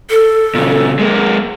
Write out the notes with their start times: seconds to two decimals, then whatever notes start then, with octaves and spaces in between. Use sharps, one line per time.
0.10 A4
0.55 A#2 C#3
0.99 G#3 A#3